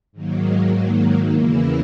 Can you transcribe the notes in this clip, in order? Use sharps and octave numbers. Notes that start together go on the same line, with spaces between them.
G#2 D#3 F#3 A#3
E2 C#3 E3 A#3 E4